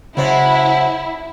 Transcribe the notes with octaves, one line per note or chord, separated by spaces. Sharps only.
C#3 F#3 G#3 E4 C5 A5